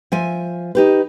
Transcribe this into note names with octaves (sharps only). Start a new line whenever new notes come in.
F3 E5 G#5
D#4 G4 B4